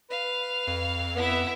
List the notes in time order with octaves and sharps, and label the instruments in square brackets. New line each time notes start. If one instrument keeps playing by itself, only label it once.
[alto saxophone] B4 [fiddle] F5
[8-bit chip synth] F2
[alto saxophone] B3 [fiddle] E4 E5